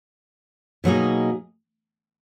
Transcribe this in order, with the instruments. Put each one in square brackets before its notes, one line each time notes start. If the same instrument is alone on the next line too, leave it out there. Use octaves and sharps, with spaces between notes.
[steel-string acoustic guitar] B2 F#3 A#3 D#4 G#4